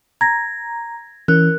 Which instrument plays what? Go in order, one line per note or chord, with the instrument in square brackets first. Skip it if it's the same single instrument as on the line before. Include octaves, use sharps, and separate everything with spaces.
[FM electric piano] A#5 [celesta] G#6 A#6
[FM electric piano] E3 C#4 [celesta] A#4 F#6